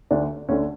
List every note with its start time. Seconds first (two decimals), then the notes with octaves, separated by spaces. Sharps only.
0.11 D2 D3 D4
0.49 D2 D3 C#4